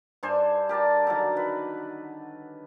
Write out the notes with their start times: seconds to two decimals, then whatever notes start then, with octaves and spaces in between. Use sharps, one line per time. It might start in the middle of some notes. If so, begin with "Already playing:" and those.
0.23 G2 D4 C5 G#5
0.69 G4 A#4 D5 A5
1.07 D3 D#3 F#3
1.37 B4